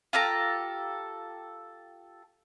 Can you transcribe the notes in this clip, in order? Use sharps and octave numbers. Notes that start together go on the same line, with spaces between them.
F4 G4 A4 A#5